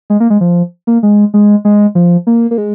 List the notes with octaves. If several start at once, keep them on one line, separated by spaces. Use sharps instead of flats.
G#3
A#3
G#3
F3
A#3
G#3
G#3
G#3
F3
A#3
A#3
G#3